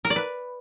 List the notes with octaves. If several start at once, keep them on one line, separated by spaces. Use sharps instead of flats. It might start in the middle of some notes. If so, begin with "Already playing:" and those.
A#4
D5
B4